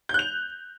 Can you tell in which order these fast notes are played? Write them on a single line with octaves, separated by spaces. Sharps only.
G6 F#6 F7